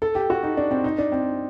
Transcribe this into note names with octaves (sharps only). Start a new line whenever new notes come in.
A4
G4
F#4
D#4
D4
C4
D#4
D4
C4